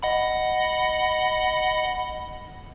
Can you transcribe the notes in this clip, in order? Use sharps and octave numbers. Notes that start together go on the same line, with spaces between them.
D#5 F#5 B5